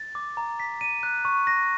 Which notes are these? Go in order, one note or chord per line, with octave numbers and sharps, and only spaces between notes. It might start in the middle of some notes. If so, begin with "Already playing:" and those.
Already playing: A6
D6
A#5
B6
D#7
F#6
C#6
A#6